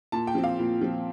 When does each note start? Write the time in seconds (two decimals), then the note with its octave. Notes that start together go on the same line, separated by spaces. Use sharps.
0.12 A#2 A5
0.27 G5
0.35 F3 C4
0.44 F5
0.59 A#2
0.81 F3 C4